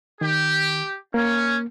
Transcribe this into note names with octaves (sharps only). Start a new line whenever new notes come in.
D#3 G4
A#3 C#4